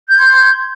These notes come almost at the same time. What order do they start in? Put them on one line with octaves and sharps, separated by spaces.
G6 G#6 C6